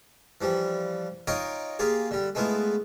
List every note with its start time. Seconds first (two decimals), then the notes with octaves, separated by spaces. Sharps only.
0.41 E3 F3 G3
1.28 D#4 F4 A#4 C#5 D#5 G5
1.79 A#3 F4 G4 G#4
2.11 D3 G3
2.35 G#3 A3 B3 E4 F4